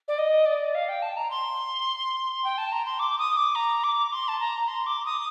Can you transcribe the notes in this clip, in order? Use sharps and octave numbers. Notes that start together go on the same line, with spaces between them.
D5
D#5
D5
F5
G5
A5
A#5
C6
G5
A5
A#5
C6
D6
D#6
D6
A#5
D6
C6
A5
A#5
C6
D6
D#6